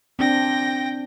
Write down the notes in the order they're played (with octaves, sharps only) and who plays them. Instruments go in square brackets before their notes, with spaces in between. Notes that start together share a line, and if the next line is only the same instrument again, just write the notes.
[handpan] C4 D4 [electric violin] G5 A#6